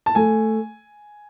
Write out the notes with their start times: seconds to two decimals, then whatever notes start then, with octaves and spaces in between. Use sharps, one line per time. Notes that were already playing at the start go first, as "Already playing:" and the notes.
0.06 A5
0.15 A3 G#5